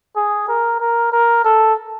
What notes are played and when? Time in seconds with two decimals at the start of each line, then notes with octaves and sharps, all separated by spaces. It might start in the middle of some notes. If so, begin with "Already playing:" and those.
0.16 G#4
0.48 A#4
0.80 A#4
1.12 A#4
1.44 A4